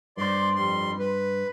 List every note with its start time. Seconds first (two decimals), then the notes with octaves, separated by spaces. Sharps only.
0.17 G2 C5 D5 C6
0.56 F2 G3 C6
0.99 B4